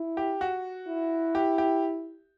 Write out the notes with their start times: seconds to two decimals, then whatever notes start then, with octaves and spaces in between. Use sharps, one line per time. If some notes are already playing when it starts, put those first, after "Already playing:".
Already playing: E4
0.17 G4
0.41 F#4
0.88 E4
1.35 G4
1.58 G4